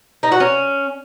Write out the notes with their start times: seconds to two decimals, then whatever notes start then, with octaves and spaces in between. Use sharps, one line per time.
0.23 D#4
0.32 F#4
0.40 C#4